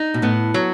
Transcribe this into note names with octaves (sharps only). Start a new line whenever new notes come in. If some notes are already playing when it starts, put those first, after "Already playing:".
Already playing: D#4
B2
A2 B3
F#3